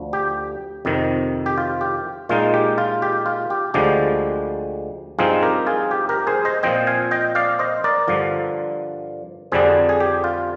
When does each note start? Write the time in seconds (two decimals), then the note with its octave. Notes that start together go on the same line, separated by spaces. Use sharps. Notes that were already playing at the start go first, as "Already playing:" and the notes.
Already playing: D2 D3 F3
0.13 G4
0.85 F2 C3 D#3
1.46 G4
1.58 F4
1.81 G4
2.29 A#2 G#3 D#4 F4
2.54 G4
2.78 F4
3.02 G4
3.26 F4
3.50 G4
3.74 D2 D3 F3 G#3 G4
5.19 G2 F3 C4 D#4 F4 G#4
5.43 G4 A#4
5.67 F4 G#4
5.91 G4
6.09 G4 A#4
6.27 G#4 C5
6.45 C5 D#5
6.63 A#2 F3 C4 D#5 G5
6.87 F5 G#5
7.11 D#5 G5
7.35 D5 F5
7.59 C5 D#5
7.84 A#4 D5
8.08 G2 D3 F3
9.52 F2 D3 G3 D4 G#4 C5
9.89 G#4
10.00 G4
10.24 F4